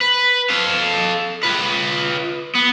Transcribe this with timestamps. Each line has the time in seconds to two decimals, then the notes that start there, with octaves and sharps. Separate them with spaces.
0.01 B4
0.50 A4 F5
1.43 F4 B4
2.55 B3